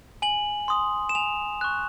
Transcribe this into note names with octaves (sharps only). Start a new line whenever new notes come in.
G#5 F#7
C6 D#6
E7
G#5 F7
C#6 F#6